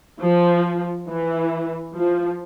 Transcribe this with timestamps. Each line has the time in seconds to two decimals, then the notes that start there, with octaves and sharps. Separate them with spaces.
0.20 F3
1.07 E3
1.95 F3